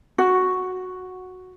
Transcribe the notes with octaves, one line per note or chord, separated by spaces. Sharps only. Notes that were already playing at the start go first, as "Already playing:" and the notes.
F#4